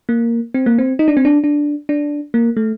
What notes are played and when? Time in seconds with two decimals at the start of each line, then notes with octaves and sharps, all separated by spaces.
0.09 A#3
0.54 C4
0.66 A#3
0.78 C4
0.99 D#4
1.08 D4
1.17 C4
1.25 D4
1.44 D4
1.89 D4
2.34 A#3
2.57 A3